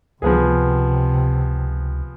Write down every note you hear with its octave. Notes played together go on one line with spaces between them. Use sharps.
C#2 C3 F3 B3 G#4